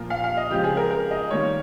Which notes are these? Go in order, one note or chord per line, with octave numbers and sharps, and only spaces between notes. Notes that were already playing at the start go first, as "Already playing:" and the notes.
Already playing: A#2 F3 A#3 F4 A#4
F5
F5
D#5
C#3 F3 G#3 C4 G4
G#4
A#4
A#4
D#5
D#3 G3 A#3 C#5